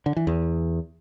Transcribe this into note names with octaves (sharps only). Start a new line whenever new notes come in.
D3
E3
E2